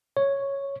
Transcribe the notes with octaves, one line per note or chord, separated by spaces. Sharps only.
C#5